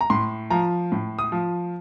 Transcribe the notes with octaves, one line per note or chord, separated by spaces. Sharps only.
A#5
A2 C6
F3 A#5
A2
D#6
F3